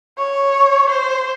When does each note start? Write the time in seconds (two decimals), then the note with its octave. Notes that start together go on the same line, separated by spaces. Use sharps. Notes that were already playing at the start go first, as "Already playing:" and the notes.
0.18 C#5
0.90 C5